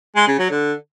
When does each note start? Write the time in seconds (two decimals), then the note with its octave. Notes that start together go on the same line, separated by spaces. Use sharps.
0.16 G#3
0.27 C#3
0.39 F#3
0.50 D3